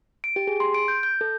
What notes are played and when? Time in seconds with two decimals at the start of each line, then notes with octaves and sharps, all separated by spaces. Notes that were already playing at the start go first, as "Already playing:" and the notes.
0.24 D7
0.36 G4
0.47 G#4
0.60 C6
0.75 D7
0.88 G6
1.03 G6
1.21 A4